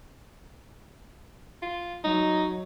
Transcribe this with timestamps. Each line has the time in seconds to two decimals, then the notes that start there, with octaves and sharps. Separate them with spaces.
1.62 F4
2.04 F#3 D#4